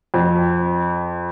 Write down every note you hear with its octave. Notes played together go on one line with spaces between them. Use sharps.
F2